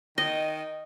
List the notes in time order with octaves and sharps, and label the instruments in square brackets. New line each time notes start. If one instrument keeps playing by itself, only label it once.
[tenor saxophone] D#3 [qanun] D#5